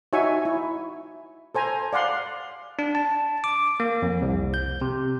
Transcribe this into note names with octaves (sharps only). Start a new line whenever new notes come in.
D#4 F#4 C#5 E5 G#5 C#6
E4
A4 C5 G#5 A#5
D5 F5 F#5 C6
D4
A5
D6
A#3
F2
C2
G6
C3